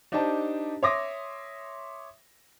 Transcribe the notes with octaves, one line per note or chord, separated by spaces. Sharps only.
D4 D#4 G4 C5 D5 A5
C#5 E5 C6 D6 D#6 A#6